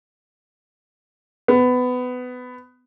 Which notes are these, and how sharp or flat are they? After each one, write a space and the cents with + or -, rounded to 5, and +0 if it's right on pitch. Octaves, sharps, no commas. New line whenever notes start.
B3 +20